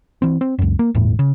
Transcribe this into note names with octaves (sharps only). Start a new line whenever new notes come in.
E3 C4
C4
C#2 F#2
A#3
G1 E2 A2
C#3